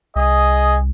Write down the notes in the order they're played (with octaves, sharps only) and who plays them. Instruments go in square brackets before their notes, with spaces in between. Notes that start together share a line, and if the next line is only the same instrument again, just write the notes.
[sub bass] C2 [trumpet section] G#4 D#5